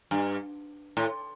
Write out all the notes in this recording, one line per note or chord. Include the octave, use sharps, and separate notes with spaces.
G2
A2